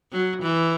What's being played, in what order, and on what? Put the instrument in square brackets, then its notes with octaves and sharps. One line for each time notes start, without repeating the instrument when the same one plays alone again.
[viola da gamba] F#3
E3